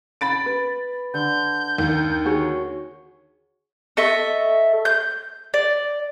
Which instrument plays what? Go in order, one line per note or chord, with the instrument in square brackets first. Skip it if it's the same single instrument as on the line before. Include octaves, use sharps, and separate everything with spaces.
[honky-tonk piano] B5 A6 D7
[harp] B4
[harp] D3 [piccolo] G6
[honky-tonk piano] D#2
[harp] F#4 G#4 C#5
[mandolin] A4 D#5 E5 C#6
G6
D5